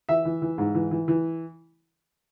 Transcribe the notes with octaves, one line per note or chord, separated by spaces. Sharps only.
E3 E5
E3
E3
G#2
E3
E3
E3